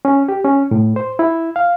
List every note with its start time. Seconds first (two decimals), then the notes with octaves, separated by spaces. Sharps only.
0.05 C#4
0.29 G4
0.44 C#4
0.71 A2
0.96 C5
1.19 E4
1.56 F5